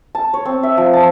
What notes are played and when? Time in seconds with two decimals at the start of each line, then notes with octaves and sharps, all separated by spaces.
0.15 A5
0.34 C#5
0.45 C4
0.63 E5
0.77 F3
0.93 A5